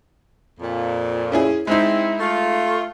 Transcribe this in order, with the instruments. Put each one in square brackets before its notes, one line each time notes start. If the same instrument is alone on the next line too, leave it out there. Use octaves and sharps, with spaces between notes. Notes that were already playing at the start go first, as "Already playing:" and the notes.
[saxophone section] F2 A#2
[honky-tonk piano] C#4 E4 G#4
[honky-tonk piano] G#3 D#4 [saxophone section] C4 E4
[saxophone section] A3 F4